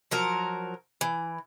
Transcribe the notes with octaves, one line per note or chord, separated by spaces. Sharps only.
F3 F#3 A#4
E3